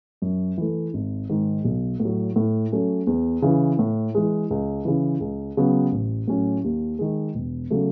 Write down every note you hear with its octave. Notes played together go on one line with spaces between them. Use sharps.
F#2
E3 A3
G#1
G#2 D#3
B1
A2
F#3
A2
F#3 A3 C#4
E2
C#3 E3
A2
E3 G#3
C#2
C#3 E3
C#2
C#3 F#3 B3
A1
A2 F#3 C#4
D#2
D#3 G#3
E1
C#3 F#3 A3